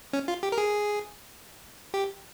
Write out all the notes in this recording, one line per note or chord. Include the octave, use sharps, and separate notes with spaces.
C#4
F4
G4
A#4
G#4
G4